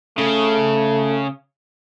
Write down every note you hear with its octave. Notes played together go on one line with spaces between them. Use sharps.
C#3 A3